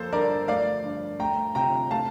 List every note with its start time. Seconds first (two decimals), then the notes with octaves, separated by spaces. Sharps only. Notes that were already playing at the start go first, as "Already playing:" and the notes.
Already playing: F2 A#3 A4 C5
0.12 G2 A#4 D5
0.48 A3 D5 F5
0.84 G2
1.19 A3 G5 A#5
1.55 C3 G5 A#5
1.91 A3 F5 A5